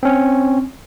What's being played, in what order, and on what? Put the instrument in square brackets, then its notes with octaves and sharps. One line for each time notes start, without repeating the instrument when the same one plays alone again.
[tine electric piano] C4 C#4